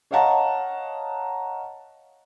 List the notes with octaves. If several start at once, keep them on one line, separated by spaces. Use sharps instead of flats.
C#5 D#5 F5 F#5 A5 A#5